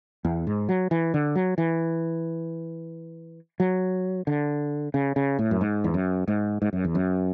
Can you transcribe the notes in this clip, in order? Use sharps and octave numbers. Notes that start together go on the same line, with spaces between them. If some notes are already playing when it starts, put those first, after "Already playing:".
E2
G#2
F#3
E3
D3
F#3
E3
F#3
D3
C#3
C#3
A2
F#2
G#2
E2
F#2
G#2
G#2
F#2
E2
F#2